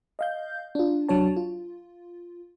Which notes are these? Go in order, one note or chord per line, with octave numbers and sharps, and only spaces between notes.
D#5 F5 G6
D4 F4
C2 F#3 D4 C#5 A5
F4